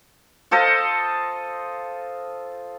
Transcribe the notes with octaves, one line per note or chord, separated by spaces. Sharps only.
F4 A4 C5 D#5